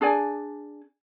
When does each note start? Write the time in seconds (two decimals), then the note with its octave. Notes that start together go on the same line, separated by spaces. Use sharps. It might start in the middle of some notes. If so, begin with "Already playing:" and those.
0.01 D4 G#4 D5 G#5